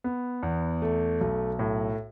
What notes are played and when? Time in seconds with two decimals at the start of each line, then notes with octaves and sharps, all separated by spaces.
0.04 B3
0.43 E2
0.82 A3
1.21 B1
1.59 A2